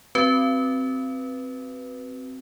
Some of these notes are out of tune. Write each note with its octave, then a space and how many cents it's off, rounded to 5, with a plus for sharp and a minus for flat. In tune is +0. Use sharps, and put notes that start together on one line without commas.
C4 +0 F#4 +30 B4 +0